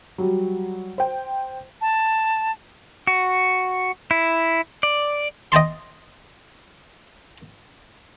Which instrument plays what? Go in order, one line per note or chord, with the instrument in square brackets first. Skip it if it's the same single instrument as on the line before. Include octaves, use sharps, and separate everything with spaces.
[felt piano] F#3 G3
C5 G5
[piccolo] A5
[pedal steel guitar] F#4
E4
D5
[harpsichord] D#5 G5 A5 C6